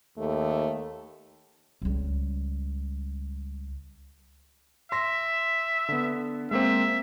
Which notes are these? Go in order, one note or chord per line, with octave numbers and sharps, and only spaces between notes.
D#2 A3
C#2 G3
E5 C6 A#6
D3 B3
G#3 A#3 C4 E5